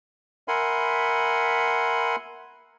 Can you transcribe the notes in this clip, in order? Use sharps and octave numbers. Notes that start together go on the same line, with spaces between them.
A#4 E5 F#5 G#5 B5 C6